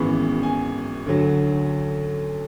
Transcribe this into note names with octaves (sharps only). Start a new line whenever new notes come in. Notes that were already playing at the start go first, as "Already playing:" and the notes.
Already playing: G#1 F#2 E3 G#3 B3 C#6
G#5
D2 D3 F#3